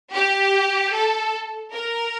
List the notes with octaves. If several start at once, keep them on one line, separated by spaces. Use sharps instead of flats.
G4
A4
A#4